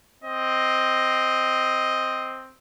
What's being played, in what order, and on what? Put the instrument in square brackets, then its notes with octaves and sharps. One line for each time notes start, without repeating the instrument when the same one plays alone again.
[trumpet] C4 [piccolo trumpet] D#5